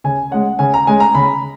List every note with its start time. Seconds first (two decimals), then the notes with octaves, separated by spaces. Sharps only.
0.04 C#3 G#5
0.31 G#3 C#4 F#5
0.59 C#3 G#5
0.74 A#5
0.87 G#3 C#4 G#5
1.00 A#5
1.15 C#3 B5